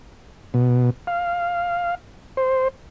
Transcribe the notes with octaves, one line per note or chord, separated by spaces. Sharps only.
B2
F5
C5